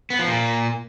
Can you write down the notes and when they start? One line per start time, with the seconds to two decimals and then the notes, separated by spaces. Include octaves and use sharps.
0.10 B3
0.19 F3
0.28 A#2